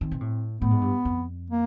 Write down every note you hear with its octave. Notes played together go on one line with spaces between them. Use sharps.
D#3 C4
B2
A2
A2 B3
G#2
G2
F2
A#3